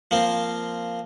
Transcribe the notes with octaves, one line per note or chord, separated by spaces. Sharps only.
F3 A#3 C4